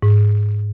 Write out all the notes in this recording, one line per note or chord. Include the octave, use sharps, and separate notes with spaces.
G#2